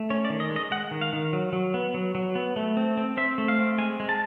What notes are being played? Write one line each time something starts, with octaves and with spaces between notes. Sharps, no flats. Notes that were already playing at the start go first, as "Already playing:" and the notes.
Already playing: A3
C#4 C#5
D5
D#3
D#5
G#3
D#5
G#3 F#5
D#3
F5
D#3
F#3
F#3
B3
F#3
F#3
B3
A3
C4
C4
C4 E5
A3
F5
C4
G#3 G#5
G#3
A5